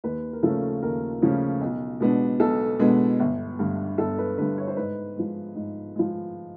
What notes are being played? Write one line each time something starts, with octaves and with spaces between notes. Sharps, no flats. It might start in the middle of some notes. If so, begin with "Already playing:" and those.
D#2 B4
A#4
C#3 F3 A3 C#4 A4
D#2 A#4
C#3 F3 A3 C#4
B1
B2 G#3 B3 D4
B1 A4
B2 G#3 B3 D4
G1
G2 D3
G1 A4
B4
G2 D3 B4
C#5
C5
G#2 B4
F3 G#3
G#2
F3 G#3